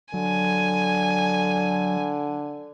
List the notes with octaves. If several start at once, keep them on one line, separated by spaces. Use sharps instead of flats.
D3 F#3 G#5